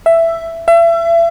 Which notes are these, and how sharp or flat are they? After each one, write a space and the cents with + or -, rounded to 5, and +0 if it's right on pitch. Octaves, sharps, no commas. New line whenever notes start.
E5 +10
E5 +35